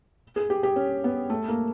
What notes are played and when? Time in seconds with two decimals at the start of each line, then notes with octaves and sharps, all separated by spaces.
0.36 G#4
0.50 G4
0.63 G4
0.76 C#4
1.04 B3
1.30 A3
1.48 A#3